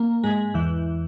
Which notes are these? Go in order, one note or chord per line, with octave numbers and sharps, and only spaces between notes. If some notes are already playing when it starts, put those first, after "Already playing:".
Already playing: A#3
G#2 G#3
E2 E3